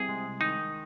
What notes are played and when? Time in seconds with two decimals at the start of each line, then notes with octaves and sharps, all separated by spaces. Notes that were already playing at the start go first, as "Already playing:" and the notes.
Already playing: C2 C3 G#4
0.09 G#3
0.40 D#3 D#4